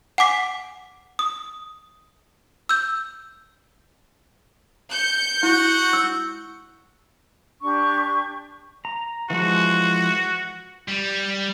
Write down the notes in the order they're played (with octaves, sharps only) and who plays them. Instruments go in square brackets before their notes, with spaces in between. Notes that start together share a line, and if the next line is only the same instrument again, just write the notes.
[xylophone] F#5 G#5 D6 B6
D#6
E6 G6
[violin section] G6 C#7
[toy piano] E4 [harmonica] F#4
[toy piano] E6
[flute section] D4 G4 C#6
[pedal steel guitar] A#5
[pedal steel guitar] E3 F3 G#3 [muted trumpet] F#4
[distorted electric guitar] G3